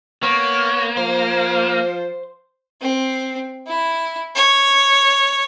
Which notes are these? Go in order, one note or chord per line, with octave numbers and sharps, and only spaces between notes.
A#3 B3 C#5
F3 C5
C4
E4
C#5